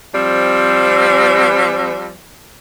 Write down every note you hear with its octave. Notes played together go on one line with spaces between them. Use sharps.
F3 G3 C4